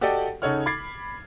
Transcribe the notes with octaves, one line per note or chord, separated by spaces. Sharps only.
F#4 G4 A4 D5 D#5 G5
C#3 D#4 A4 C#5 F#5 F6
B5 D6 G#6 A6 C7